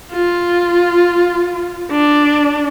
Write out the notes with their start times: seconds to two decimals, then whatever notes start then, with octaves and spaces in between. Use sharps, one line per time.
0.12 F4
1.91 D4